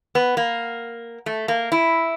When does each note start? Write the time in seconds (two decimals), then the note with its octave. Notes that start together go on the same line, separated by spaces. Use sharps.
0.15 B3
0.37 A#3
1.26 A3
1.48 A#3
1.72 E4